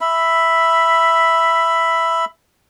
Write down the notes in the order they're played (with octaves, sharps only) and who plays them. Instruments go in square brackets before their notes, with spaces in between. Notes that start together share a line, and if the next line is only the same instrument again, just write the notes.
[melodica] E5 B5